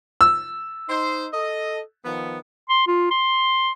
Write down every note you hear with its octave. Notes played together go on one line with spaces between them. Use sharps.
E6
D#4 C5
A4 D#5
D#3 F3 B3
C6
F4
C6